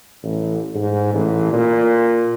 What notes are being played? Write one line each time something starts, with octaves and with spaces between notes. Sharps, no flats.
A1
G#2
A1
A#2